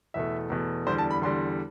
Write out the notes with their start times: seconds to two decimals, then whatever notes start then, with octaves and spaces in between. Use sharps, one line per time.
0.14 E2 B2 A3 E5
0.50 E2 B2 A3
0.87 E2 D3 G3 C5
0.98 A5
1.11 B5
1.22 E2 D3 G3 C6